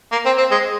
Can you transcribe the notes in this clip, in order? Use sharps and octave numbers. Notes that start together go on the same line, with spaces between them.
A#3
C4
C4
G#3